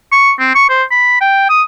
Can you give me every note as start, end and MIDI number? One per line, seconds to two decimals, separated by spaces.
0.12 0.32 85
0.40 0.51 60
0.55 0.67 85
0.70 0.84 72
0.91 1.21 83
1.21 1.45 79
1.49 1.62 87